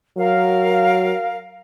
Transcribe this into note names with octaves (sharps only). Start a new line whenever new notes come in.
F#3 A#4 F5